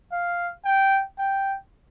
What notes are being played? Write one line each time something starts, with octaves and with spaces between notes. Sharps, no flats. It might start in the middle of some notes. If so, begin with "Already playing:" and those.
F5
G5
G5